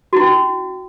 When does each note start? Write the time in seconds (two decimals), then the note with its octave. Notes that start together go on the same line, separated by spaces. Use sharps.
0.13 F#4
0.16 E4
0.20 C#4